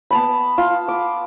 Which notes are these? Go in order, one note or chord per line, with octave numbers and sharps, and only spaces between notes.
B3 A5 B5
F4
D6